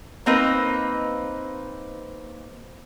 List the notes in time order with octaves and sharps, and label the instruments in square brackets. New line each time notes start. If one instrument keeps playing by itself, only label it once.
[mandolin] A#3 C4 D#4 B4